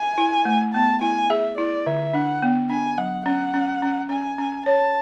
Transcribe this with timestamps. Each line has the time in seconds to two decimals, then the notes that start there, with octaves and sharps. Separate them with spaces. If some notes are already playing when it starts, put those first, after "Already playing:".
Already playing: G#5
0.18 E4
0.45 A3
0.74 B3 A5
1.01 E4 G#5
1.30 G#4 E5
1.58 E4 D5
1.86 D3 E5
2.13 D4 F#5
2.42 B3
2.69 D4 G#5
2.98 F#3 F#5
3.26 C#4 F#5
3.54 C#4
3.82 C#4
4.09 C#4 G#5
4.38 C#4
4.66 C#5 A5